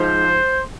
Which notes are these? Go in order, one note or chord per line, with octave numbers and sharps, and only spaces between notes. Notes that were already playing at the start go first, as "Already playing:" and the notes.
Already playing: G#2 F3 C5